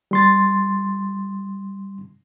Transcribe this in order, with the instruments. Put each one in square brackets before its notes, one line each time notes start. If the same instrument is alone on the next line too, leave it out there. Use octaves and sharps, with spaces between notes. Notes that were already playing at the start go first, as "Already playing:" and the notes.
[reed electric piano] G3 C6 A6